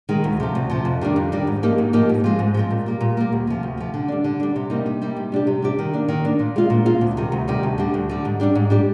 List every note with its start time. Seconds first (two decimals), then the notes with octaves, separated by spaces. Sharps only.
0.09 D#3 G#3
0.24 D2
0.40 C3 F3
0.55 D2
0.70 C3 F3
0.85 F2
1.01 D#3 G3 D4
1.16 F2
1.32 D#3 G3 D4
1.47 G#2
1.63 F3 A#3 D#4 G4
1.78 G#2
1.93 F3 A#3 D#4 G4
2.09 G#2
2.24 F3 G#3 C4
2.39 G#2
2.54 F3 G#3 C4
2.71 A#2
2.86 G3 A#3
3.01 A#2
3.17 G3 A#3
3.32 D2
3.47 C3 F3
3.63 D2
3.77 C3 F3
3.94 D3
4.08 G3 D4
4.24 D3
4.40 G3 D4
4.56 C3
4.70 G3 A#3 D#4
4.86 C3
5.02 G3 A#3 D#4
5.17 C3
5.32 G3 D4 G4
5.47 C3
5.62 G3 D4 G4
5.79 D#3
5.93 A#3 D4
6.08 D#3
6.25 A#3 D4
6.39 A#2
6.56 G#3 C4 F4
6.70 A#2
6.86 G#3 C4 F4
7.01 D2
7.17 C3 D#3 G3
7.32 D2
7.48 C3 D#3 G3
7.63 D2
7.78 D3 G3
7.94 D2
8.09 D3 G3
8.25 G#2
8.40 G3 D4 G4
8.55 G#2
8.70 G3 D4 G4